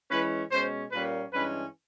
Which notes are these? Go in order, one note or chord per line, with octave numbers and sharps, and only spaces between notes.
E3 G#3 C#4 B4
B2 G#3 C#4 C5
A#2 G3 A#3 C#4 B4
G2 E3 G#3 C#4 B4